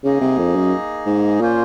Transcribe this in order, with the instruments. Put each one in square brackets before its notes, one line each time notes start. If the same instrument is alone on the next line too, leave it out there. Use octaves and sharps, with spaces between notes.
[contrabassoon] C#3 [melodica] A#3 D#4 G#4 D#5
[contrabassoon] C3
F2
F#2
G#2
[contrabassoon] A#2 [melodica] A#3 C#4 F4 C5